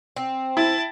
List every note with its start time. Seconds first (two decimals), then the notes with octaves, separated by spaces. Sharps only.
0.16 C4
0.57 E4 A5